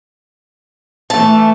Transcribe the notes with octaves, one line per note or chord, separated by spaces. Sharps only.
E3 A3 A5